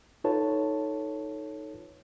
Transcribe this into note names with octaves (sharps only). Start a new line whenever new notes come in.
D#4 F4 A4 B4 C#5 A5